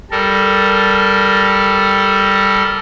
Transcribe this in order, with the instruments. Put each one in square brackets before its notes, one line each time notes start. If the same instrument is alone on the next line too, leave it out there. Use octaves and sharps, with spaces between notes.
[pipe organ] G3 A4 A#4